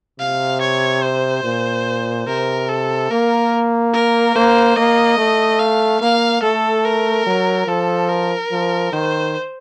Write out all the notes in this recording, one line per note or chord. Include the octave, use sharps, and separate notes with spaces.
C3 F5
C#5
C5
A#2
C3 A#4
A4
A#3 A#4
A#4
A#3 C5
A#3 D#5
A3
F5
A#3 F5
A3 A4
A#4
F#3
F3 A4
A#4
F3
D#3 C5